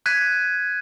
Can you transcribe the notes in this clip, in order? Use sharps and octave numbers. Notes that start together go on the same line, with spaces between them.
F#6 G#6 B6 D#7